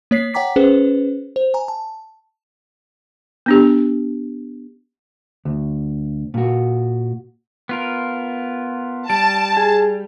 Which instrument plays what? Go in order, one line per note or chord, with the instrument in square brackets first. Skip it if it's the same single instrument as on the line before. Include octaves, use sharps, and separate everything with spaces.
[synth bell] A#3 C#5 B6 C7
C#5 F#5 G5 A#5 D6 B6
C#4 G#4 B4 C5
C5
G#5 A#5
A5
[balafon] B3 D4 G4
[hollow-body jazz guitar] D2
A#2 F#4
[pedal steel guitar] B3 F4 A#4
[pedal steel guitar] G3 [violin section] A5 [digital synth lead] D7
[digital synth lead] G#4